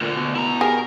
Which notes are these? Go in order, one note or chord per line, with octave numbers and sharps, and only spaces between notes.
D2 A#2 D3
B2
E4 A#5
G4 G#4 A#4